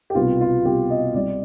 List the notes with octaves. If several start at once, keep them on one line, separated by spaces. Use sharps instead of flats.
G4
C2 B2 B3 F4
F4
C2 B2 B3 G4
D#5
C2 C3 G3 D5